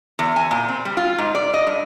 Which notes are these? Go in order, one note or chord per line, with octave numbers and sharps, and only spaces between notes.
E2
G#5
A#2
C4
G3
F4
G#2
D5
D#5
G2